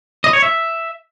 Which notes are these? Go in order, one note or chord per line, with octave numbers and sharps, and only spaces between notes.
D#5
C#5
E5